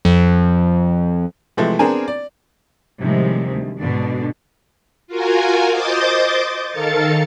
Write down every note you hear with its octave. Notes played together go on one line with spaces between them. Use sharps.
F2
C3 E3 F3 G#3 A3
B3 C4 D4 G#4 A#4 G#5
D5
A2 C3 D#3 F3 G3 G#3
D2
G#2 B2 D3 D4
F4 F#4 A#4 G#5
C5 D#5 D6 D#6 G6 A6
D#3 A4 A#4 F5 A6 C#7